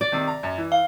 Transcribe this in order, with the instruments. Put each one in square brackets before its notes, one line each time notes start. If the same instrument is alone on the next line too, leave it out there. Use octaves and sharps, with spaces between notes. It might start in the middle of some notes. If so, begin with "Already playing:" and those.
[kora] D5
[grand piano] C3 D#3
A#5
F#2
E3
[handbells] F5